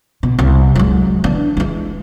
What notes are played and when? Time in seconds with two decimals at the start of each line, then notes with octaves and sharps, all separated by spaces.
0.23 B2
0.39 C2
0.75 F#3 G#3
1.24 E3 D4
1.57 E3 G#3